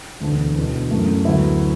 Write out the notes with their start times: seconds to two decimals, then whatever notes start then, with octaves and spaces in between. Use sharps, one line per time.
0.20 E1 D2 D3 B3 D4
0.56 E1 E2 B2 B3 D4
0.90 F#2 E3 A3
1.25 D2 D3 F#3 B3 E4